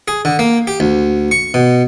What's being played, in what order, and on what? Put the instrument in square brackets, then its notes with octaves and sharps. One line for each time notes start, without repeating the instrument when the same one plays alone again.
[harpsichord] G#4
D3
A#3
G4
D2
C#6
B2